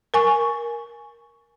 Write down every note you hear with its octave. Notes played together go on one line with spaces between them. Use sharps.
A#4 G#5 C#6